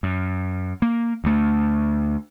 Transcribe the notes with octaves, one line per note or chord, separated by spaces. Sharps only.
F#2
A#3
D2 A3